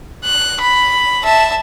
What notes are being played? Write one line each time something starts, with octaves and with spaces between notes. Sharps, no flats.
F#6
B5
E5 A5